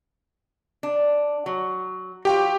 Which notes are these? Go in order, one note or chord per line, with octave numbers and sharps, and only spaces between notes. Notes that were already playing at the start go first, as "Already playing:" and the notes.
D4
F#3
F#3 F4 G4 G5